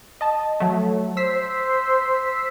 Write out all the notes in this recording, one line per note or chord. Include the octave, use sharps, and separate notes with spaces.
D#5 A5
F#3 A3
C5 E6 B6 C7